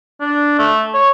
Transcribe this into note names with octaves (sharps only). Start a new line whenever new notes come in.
D4
A3
C#5